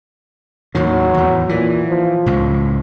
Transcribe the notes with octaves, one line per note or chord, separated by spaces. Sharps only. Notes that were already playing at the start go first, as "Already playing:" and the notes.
D#2 A2 D#3 F#3
E2 A2
A#2 E3
F3
C#2 A2